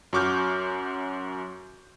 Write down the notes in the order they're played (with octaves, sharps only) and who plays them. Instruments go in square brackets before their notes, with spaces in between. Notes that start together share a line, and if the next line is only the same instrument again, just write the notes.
[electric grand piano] F#2 F#4 C#6 D6 F6 G6